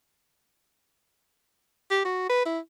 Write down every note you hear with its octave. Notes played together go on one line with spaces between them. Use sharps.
G4
F#4
B4
E4